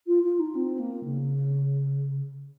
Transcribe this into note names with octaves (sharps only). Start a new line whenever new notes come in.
F4
F4
D#4
C4
A#3
C#3